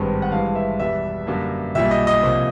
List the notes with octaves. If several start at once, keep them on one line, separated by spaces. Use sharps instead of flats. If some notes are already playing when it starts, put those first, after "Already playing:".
Already playing: G#1 G2 D#3 G#3 B3
F#5
G2 E3 G#3 F5
E5
E2 B2 G3 B3 E5
F#2 D3 G3 A#3
B1 A#2 G3 E5
D#5
D#5
C2 A#2 F3 A#3